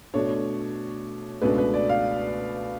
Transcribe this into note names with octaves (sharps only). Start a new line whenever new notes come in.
B2 A3 D4 C#5
C#2 B2 A3 D4 B4
B4
D5
F5